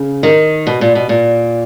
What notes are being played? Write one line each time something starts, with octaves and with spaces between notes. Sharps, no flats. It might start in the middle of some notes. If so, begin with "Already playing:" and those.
Already playing: C#3
D#3
B2
A#2
B2
A#2